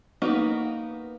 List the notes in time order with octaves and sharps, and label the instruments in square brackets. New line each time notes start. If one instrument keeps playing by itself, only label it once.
[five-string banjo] A#3 B3 D#4 F#4 B4